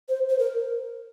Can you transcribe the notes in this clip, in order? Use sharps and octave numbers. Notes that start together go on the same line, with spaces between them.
C5
C5
A#4